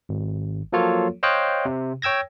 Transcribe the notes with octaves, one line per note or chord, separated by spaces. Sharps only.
G#1
F3 F#3 A#3 F4 A4 C#5
C5 C#5 D#5 F5 G5 F#6
C3
C#5 G5 E6 G#6 A#6